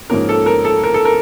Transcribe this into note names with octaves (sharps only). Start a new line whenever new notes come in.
G#2 F3 A#3 C#4 A#4
A4
A#4
A4
A#4
A4
A#4